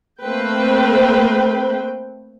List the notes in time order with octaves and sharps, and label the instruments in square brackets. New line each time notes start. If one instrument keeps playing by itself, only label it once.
[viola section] A3 A#3 C4 B4 C5 G5